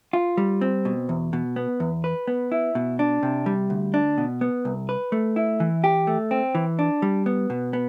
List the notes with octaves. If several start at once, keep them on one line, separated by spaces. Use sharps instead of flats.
F4
G3
C4
B2
E2
B2
B3
E2
B4
B3
E4
B2
D4
C3
G3
D2
D4
B2
B3
C2
B4
A3
E4
E3
G4
A3
C4
E3
D4
G3
B3
B2
B3